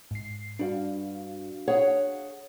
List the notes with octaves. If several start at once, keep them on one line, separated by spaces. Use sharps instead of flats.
G#2 C7
G2 D4 F#4 F5
G#4 C#5 F#5